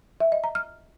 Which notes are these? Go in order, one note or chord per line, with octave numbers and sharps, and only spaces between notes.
E5
D#5
A#5
F6